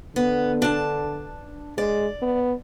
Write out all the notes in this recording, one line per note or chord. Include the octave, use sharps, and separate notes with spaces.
D3 B3
D4 A5
G#3 D5
B3